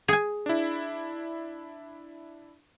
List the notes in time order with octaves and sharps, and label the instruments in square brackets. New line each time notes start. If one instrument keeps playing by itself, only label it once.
[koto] G#4 G#5
[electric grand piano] D4 E4